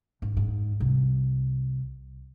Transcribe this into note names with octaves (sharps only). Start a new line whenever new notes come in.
G#1
G#2
C2